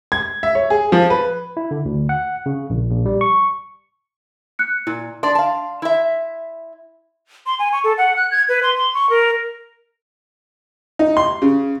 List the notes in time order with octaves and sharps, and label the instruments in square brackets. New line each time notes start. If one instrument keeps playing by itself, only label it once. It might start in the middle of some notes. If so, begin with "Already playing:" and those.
[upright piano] G#6
E5
C#5
G#4
F3
B4
[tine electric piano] E4
D3
D2
F#5
C#3
A#1
A#1
G3
C#6
[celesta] F#6 C#7
[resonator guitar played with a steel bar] A#2 [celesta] E4
[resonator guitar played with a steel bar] D4 D5 [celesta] C6
[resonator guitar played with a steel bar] F5 A5
E4 E5
[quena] C6
G#5
C#6
A4
F#5
F#6
G#6
B4
C6
C6
C#6
A#4
[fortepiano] D#4
C6
C#3